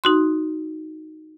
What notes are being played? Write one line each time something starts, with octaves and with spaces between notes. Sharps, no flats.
D#4 F#4 C6